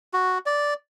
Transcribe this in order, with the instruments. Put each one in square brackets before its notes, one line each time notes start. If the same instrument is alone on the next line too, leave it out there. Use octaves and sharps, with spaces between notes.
[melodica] F#4
D5